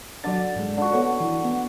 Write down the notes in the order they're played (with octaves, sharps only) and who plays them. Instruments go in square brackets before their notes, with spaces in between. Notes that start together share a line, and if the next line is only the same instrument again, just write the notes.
[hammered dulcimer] D3 [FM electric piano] F#3 D5 A6
[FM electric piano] G#2 G#3
[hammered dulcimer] D3 F#4
[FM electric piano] B3 A4 C#5
E3
B3